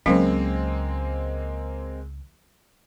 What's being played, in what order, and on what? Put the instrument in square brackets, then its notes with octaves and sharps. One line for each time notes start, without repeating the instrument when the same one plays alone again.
[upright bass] C#2 [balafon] F#3 C#4 F5 [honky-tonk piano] G#3 A#3 C4